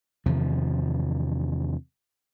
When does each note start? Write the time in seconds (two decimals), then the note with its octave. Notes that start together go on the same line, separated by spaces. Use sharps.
0.26 E2 C3 D#3 F3